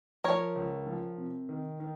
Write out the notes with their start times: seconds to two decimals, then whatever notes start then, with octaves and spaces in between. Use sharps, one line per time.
0.24 F3 A#4 C#5
0.56 C#2
0.87 F3
1.18 C3
1.49 D#3
1.80 D#3